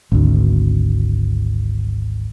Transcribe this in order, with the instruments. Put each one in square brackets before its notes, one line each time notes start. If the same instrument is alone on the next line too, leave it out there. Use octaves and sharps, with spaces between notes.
[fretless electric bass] G#1 D2